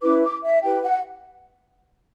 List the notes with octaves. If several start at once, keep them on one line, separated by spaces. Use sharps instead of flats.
C#4 E4 B4 D6
D6
E5
E4 G4 B4 G5
F#5